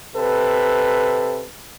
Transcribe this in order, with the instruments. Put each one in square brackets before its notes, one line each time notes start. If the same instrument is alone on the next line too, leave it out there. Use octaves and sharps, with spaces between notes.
[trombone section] C3 A4 B4